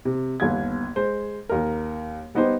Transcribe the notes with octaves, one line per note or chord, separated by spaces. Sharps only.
C3
G1 D#2 B3 G#6
G#3 C5
D#2 A#4
G3 B3 D#4 G4 C5